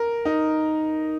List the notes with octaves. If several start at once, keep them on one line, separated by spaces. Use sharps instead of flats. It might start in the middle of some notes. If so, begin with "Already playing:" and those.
Already playing: A#4
D#4